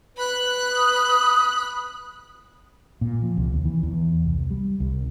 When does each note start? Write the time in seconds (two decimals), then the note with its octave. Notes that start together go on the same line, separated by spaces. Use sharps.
0.17 B4 B5 F#6
0.71 D#6
3.01 A#2
3.22 F3
3.37 C2
3.52 D#2
3.65 E3
3.83 E2
4.25 C2
4.51 G3
4.80 C2